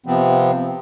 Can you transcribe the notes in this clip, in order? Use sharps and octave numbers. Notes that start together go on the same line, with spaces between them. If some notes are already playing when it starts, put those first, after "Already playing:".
C3 F3 B3 C4